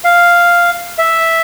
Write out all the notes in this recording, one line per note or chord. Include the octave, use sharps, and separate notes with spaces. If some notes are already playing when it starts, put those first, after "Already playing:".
F5
E5